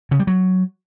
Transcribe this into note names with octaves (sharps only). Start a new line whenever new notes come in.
C#3
G3
F#3